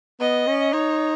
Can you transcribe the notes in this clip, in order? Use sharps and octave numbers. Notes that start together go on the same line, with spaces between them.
B3 D#5
C#4
D#4 C#5